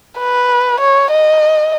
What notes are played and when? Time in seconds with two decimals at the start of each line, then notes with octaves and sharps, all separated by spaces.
0.19 B4
0.80 C#5
1.11 D#5